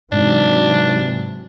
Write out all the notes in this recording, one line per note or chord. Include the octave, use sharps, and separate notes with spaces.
G#2 C3 E3 F#3 D4